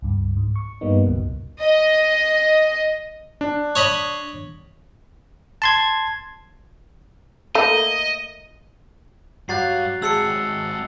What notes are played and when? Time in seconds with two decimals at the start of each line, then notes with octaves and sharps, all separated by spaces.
0.02 C#2 G2
0.37 G#2
0.56 C#6
0.81 G2 G3 A#3 B3 D#4
1.06 C#2 F#2 B2
1.59 D#5
3.41 D4
3.76 C#5 D#5 B5
5.62 A5 C6 G#6
7.55 A3 A#3 D#5
9.49 G2 F#3 G4 C#5 F5 F#6 A6 C7
10.02 G#3 C4 G#4 E5 A5 E6 C7 C#7